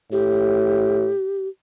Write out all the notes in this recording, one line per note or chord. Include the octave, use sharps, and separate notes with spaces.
A2 G4